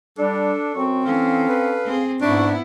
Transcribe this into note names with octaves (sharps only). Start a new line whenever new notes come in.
G3 D4 A4
F#2 F#3 C4 C#6
E3 C#4 A4 F5
B4
C4 G#4
D2 G#2 B3 D4 E4 C#6